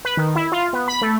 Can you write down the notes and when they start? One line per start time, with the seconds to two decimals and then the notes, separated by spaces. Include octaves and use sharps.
0.05 B4
0.17 D#3
0.36 E4
0.52 F4
0.73 B3
0.88 B5
1.01 A3